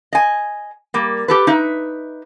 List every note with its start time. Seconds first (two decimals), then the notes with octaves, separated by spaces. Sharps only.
0.13 D#5 G#5
0.94 G3 A#3
1.28 G4 A4 B4
1.47 D#4 B4 E5